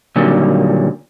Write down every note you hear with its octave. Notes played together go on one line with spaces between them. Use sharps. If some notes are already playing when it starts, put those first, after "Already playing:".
A#2 D3 D#3 F#3 G3